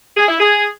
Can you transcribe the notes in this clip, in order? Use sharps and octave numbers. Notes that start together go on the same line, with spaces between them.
G#4
E4
G#4